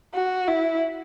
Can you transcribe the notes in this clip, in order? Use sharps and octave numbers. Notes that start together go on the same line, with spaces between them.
F#4
E4